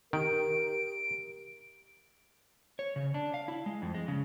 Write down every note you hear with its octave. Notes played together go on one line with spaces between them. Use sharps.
D#3 G4 A#4 D7
C#5
C#3
D4
F5
E4
G#3
F2
G#3
C#3